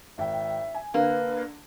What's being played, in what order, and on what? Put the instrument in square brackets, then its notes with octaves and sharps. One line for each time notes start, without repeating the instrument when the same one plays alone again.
[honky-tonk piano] G#1 G5 [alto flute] E5
[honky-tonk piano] G#5
[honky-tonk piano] D3 [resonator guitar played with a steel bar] A#3 [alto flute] B4